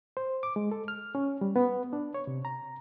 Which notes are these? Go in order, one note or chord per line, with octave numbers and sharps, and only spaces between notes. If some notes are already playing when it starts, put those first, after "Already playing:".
C5
D6
G#3
A4
F6
C#4
G3
B3
D4
C#5
C3
A#5